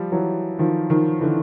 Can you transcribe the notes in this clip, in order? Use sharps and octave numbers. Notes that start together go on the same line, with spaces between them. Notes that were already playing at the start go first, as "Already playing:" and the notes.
Already playing: F3 G3
E3 F#3
D#3 F3
D#3 F3
D3 E3